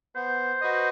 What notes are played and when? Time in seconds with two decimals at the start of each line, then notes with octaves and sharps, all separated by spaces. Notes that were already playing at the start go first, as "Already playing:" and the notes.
0.16 B3 C5
0.61 F#4 B4 D#5